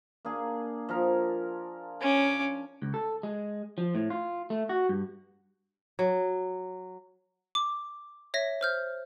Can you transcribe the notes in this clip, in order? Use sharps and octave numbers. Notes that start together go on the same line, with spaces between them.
A#3 D4 G#4
F3 A#4
C#4 D6
C#2
A4
G#3
F3
A2
F4
A3
F#4
G2
F#3
D6
C#5 E5 A#6
C5 F6 G6